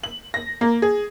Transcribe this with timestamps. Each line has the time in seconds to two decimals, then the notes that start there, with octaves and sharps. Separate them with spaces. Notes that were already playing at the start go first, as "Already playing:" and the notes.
0.03 F#7
0.34 A#6
0.61 A#3
0.82 G#4